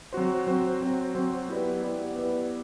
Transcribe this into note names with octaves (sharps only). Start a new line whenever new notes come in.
F#3 C4 F#4 C5
F#3 C4 F#4 C5
F#3 C4 F#4 C5
F#3 C4 F#4 C5
B3 E4 G4 B4 D5
B3 E4 G4 B4 D5
B3 E4 G4 B4 D5